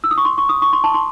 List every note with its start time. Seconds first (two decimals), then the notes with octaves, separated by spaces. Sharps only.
0.04 E6
0.11 D#6
0.18 C#6
0.25 C6
0.38 C#6
0.49 D#6
0.62 C#6
0.73 C6
0.84 A5
0.94 C6